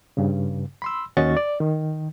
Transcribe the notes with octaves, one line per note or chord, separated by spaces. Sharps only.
G2 C#3
B5 C6 E6
D#2 C#4 F#4 D#5 C#6 A6
D5
D#3